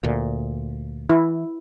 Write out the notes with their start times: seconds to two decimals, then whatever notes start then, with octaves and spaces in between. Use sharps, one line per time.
0.03 D2 A#2
1.09 E3 E4